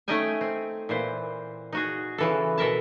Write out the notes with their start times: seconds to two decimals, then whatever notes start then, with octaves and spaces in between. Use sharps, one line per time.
0.08 A3 C#4 D#4 D#5 G5 G#5
0.41 C4
0.89 A#2 E3 C5
1.73 D#4 F#4 G#4
2.18 C#3 E3 A4
2.58 B2 A4 A#4 E5 A5